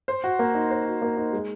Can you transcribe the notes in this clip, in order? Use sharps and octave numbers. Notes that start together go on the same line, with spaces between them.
C5
F#4
A#3
D#4
C5
F#4
A#3
D#4
G#3